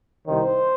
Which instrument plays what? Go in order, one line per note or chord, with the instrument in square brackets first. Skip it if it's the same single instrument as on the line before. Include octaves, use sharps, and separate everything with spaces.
[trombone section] C2 C3 D#3 C5